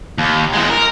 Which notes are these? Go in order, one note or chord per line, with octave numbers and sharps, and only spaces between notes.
D#2
E2 G#3
A#4